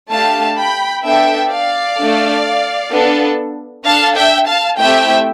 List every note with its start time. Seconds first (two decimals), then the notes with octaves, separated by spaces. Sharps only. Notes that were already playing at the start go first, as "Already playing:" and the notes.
0.10 A3 D4 G4 F5 A5
0.57 G5 B5
1.04 B3 D4 A4 E5 G5
1.50 D5 F5
1.97 A3 D4 A4
2.91 B3 D4 A4
3.85 D4 A4 F5 A5
4.16 E5 G5
4.47 F5 A5
4.79 A3 C4 E4 G4 E5 G5